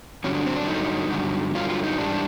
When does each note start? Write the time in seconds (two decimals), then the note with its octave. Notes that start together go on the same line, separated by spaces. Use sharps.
0.24 G2 D3 F#3 C#4
0.35 D4
0.46 C4
0.56 D4
0.67 G2 D3 F#3 D#4
1.11 G2 D3 F#3
1.55 G2 D3 F#3 F4
1.69 F4
1.84 D#4
1.98 G#2 E3 G3 D4